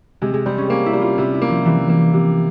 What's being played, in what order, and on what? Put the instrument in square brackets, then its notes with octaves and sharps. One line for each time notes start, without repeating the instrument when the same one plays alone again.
[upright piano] C3 [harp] G#3
[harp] G#3
[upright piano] G3 [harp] C4
[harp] C#4
[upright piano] A#3 [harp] C#4
[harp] E4
[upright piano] G3
[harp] F4
[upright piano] C3 [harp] E4
[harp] E4
[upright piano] A#3
[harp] F3
[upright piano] C3 [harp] E3
[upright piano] A#3
C3